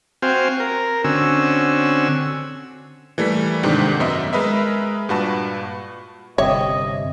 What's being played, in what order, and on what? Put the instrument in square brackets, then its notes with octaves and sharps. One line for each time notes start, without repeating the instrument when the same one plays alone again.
[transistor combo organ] C4 F#4 C5 F5 G5 G#5
A#4
D3 C4 C#4 F#4 G#5 E6
[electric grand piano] E3 G3 A3 A#3 B6
G#2 C3 D#3 D4 G4
F#2 B3 D#5 E5
G#3 A#4 B4 D#5 E5
G2 A#2 F#4 B4 A5
[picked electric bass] G1 C3 [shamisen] C#5 [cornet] D#5 [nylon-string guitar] E5 G5